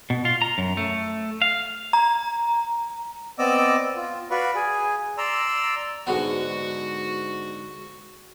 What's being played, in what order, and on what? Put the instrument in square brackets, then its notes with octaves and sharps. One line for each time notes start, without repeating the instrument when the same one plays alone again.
[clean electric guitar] B2
F4
A#5
F#2
A3
F5
[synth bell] A#5
[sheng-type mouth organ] B3 C4 D5 D#5 D6 E6
F4
F#4 B4 D5 F5 B5 C#6
G#4 G#5
D5 A#5 C6 E6
[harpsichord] G#2 D3 B3 [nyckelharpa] F#4